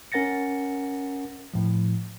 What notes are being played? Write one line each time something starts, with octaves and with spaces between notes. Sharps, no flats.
C#4 A#4 F#5 A6 A#6 C#7
A2 F3